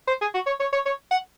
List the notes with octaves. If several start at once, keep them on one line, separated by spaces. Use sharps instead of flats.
C5
G#4
F#4
C#5
C#5
C#5
C#5
F#5